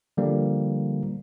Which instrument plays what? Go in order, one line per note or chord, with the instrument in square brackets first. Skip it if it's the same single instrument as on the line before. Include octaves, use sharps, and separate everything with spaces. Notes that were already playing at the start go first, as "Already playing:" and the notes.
[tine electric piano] D3 F3 G3 A#3